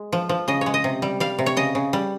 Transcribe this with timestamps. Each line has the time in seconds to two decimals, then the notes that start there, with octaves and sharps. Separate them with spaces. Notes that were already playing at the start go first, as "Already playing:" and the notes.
Already playing: G#3
0.12 F3
0.29 F3
0.48 C#3 D#5
0.61 C#5
0.66 G#3
0.74 D#5
0.84 C3
1.02 G3
1.20 G3 F5
1.39 C3
1.46 C#5
1.57 C#3 D#5
1.75 C#3
1.93 G3